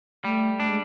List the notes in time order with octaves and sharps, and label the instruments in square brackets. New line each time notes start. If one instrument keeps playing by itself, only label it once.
[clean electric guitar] G3 [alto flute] A3
[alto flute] A3 [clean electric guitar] D4
[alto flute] G#3